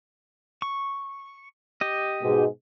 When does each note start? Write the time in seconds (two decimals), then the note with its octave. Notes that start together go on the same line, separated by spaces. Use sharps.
0.62 C#6
1.81 G4 D#5
2.23 G#2 B2 G#3